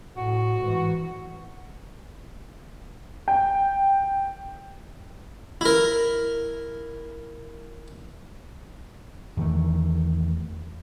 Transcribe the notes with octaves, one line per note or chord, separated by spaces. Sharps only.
A2 F#4
G#2 E3
G5
E4 A#4
E2 D#3 A3